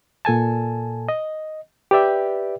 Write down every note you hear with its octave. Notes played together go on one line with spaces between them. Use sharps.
A#2 A4 G#5 A5
D#5
G4 B4 D5 E5 G5